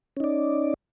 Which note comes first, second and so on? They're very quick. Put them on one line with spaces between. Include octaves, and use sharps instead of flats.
C#4 D#4 D5